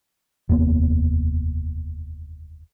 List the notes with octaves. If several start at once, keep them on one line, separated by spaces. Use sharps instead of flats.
F1 D#2 A#3 B3